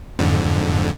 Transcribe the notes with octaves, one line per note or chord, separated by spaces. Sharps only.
F2 G#2 D3